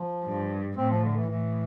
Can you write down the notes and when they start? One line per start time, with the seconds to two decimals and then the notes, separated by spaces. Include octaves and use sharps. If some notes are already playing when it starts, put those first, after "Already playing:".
Already playing: F3
0.24 G2
0.77 A2 C4
0.91 F3
1.04 D3
1.16 E3
1.30 A2 E3